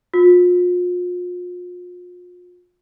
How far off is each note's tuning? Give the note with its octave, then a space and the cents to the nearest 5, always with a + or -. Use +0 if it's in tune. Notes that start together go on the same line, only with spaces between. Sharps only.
F4 +40